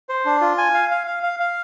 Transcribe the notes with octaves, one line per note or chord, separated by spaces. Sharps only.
C5
D4
F4
G#5
F5
F5
F5
F5
F5